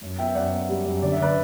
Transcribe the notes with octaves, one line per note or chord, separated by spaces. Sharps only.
F#2
B3 E5 G5
F#2 D5 F#5
B3
G3
F#2
D3 D5
E5
D3 B4 D5